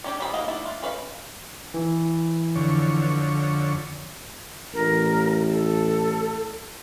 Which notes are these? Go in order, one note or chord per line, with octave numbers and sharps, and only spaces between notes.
G3 C#4 D4 G4
E3 F3 G3 G#4 B5
A#3 D#5 F5 F#5
A3 D4 E4
F4
C#4 B4 E5 F5
E3
F2 D3 C#5
A1 A#4
A4